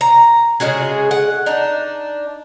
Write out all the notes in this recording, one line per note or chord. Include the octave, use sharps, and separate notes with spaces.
A#5
C#3 G#3 F#4 G#4
F#5
D4 D#4